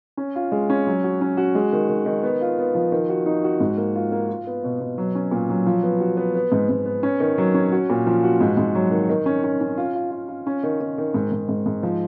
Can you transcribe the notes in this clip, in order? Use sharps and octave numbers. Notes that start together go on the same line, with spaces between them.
C#4
F4
G#3
C#4
F#3
F#4
C#4
F#4
G#3
D#3
D#3
D#3
B3
F4
B3
F3
D#3
F#4
D#4
F#4
G#2
A#3
F4
A#3
F4
B3
B2
B2
F#3
C#4
A#2
F#3
F3
B3
F#4
B3
B3
G#2
G#2
B3
C#4
D#3
F#3
C#4
F#4
A#2
F3
F#4
G#2
G#2
F#3
D#3
D#3
C#4
C#4
C#4
F4
F4
F4
F4
C#4
D#3
D#3
D#3
G#2
G#2
G#2
G#2
F3